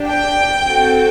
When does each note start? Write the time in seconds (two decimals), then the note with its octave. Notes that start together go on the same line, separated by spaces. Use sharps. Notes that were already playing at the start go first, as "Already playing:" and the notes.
Already playing: D4 G4
0.10 G5
0.68 C4 F#4 A4